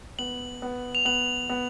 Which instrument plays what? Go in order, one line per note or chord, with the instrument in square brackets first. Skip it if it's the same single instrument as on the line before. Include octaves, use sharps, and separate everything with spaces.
[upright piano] B3 [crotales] F#7
[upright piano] B3
[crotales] F7
[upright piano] B3 [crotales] F#7
[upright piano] B3